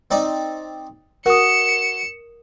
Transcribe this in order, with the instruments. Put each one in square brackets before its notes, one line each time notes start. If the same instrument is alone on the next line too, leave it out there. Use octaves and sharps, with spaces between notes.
[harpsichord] C4 D#4 D5
[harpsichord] F#4 [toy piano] A#4 D#6 [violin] C#7 E7